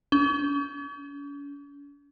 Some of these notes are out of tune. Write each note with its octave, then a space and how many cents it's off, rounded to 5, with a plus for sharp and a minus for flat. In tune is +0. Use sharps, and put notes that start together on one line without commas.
C#4 +45